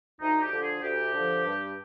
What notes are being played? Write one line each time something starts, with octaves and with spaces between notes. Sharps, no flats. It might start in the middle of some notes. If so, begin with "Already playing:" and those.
D2 D#4
G4
D3 F3
G#4
D2 G4
D3 F3
G2